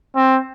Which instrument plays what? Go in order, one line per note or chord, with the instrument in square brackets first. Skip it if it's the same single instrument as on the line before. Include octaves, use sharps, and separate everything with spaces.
[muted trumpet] C4